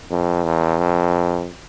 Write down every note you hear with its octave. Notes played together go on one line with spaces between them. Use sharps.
F2
E2
F2